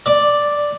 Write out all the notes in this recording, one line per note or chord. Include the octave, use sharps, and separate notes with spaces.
D5